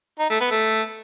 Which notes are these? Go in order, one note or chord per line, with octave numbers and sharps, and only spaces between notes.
D#4
A3
B3
A3